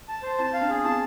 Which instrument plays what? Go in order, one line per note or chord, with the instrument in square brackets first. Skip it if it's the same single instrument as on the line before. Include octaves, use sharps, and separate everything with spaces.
[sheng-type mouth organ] A5
C5
[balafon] C4 E4 [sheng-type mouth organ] A5
[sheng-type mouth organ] F5
[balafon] B3 D4
[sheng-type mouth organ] G#4
[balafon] C4 E4 [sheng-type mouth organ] A5